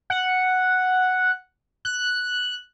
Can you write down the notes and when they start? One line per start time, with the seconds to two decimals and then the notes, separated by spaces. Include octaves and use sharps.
0.10 F#5
1.85 F#6